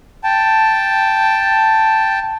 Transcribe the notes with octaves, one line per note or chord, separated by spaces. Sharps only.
G5 A5